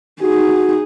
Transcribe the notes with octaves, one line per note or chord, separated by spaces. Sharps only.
D#4 F#4 G#4